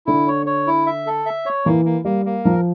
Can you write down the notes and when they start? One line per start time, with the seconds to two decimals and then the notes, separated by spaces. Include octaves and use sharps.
0.06 D3 E4
0.27 C#5
0.46 C#5
0.67 E4
0.86 E5
1.07 A4
1.26 E5
1.46 C#5
1.66 E3 A#3
1.85 A#3
2.05 G3 A#3
2.25 A#3
2.44 F3 A#4